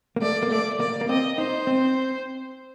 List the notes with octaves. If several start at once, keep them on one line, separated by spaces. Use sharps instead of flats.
A#3
A3 D5
A#3
A3 D5
A#3 D5
A#3
C4 D#5
D#4 C5
C4